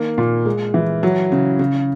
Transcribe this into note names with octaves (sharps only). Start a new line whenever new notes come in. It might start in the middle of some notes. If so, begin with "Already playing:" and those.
Already playing: D#3 A#3
A#2
G#3
E3
F#3
C#3
C#3